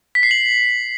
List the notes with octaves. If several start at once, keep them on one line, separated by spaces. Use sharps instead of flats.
B6
C7
F#7